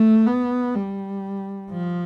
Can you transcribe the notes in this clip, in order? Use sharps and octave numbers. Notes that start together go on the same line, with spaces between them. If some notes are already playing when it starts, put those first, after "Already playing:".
Already playing: A3
B3
G3
F3